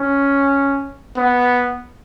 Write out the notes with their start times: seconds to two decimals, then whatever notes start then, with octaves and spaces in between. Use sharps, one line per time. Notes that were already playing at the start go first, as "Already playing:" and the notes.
Already playing: C#4
1.17 B3